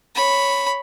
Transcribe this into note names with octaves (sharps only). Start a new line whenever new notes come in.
C#5 B5